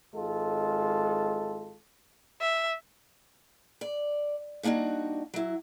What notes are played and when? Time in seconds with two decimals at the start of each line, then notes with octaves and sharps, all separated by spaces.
0.15 G#1 G#3 F4 A4
2.41 E5
3.81 D5
4.63 G3 A#3 D4 D#4 F#4
5.34 F#3 E4